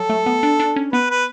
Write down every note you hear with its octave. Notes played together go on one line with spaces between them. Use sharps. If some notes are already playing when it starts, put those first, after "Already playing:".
Already playing: F#3 A4
A3
B3
D4
D4
C#4
B3 B4
B4